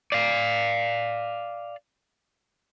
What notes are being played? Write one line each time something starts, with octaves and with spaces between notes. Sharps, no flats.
D5 F5